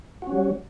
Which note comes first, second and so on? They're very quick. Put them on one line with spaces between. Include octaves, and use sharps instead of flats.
F#4 C#4 G3